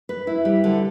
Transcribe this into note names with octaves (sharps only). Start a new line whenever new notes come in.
B4
E4
G3
D3